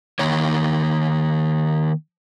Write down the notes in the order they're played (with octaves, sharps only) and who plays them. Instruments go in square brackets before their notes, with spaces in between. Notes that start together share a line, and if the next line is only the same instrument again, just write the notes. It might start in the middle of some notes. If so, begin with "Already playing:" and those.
[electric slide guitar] D#3 A#3 C#5